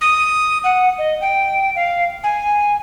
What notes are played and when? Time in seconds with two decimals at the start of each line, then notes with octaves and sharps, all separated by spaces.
0.01 D#6
0.64 F#5
0.98 D#5
1.21 G5
1.76 F5
2.24 G#5